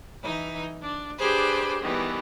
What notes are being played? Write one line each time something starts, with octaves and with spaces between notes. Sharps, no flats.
E3 D#4
D4
D4 G4 G#4 B4 C5
D#3 E3 G3 B3